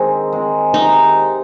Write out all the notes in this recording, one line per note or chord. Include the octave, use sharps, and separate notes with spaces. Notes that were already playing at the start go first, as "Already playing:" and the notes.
Already playing: D#3 G#3 C4 G#4
G#3 C4
C3 D#4